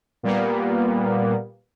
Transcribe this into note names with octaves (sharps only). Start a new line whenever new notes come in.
A#2 G3 A#3 B3